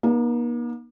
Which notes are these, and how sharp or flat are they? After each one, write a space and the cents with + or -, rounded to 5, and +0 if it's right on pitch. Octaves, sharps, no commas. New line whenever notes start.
A#3 +45 D#4 -15